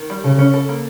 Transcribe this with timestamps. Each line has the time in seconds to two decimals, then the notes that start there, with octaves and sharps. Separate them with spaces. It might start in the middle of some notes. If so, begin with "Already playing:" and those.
Already playing: D#3
0.10 G3
0.24 C#3 A4
0.39 C#4
0.53 A4
0.69 A#3